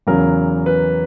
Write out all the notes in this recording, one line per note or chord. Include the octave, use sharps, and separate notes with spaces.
E2 C#3 F#3 A#4
B4